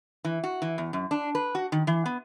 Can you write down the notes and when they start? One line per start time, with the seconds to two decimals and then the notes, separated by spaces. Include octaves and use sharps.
0.25 E3
0.44 F#4
0.62 E3
0.78 E2
0.93 F#2
1.11 D4
1.35 B4
1.55 F#4
1.72 D#3
1.87 E3
2.06 B3